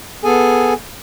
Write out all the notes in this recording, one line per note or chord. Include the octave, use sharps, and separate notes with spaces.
B3 G#4 A4 G#5